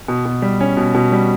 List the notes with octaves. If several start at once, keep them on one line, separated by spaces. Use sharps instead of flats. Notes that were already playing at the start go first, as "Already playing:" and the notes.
B2
B2
G3
C#4
B2
B2
G3